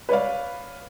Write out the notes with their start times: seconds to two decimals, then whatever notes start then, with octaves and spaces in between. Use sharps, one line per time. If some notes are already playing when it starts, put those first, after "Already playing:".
0.09 B4 C#5 D5 F5